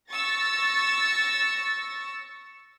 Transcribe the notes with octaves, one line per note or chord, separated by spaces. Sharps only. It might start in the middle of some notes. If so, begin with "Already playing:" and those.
C#6 E6 A6 A#6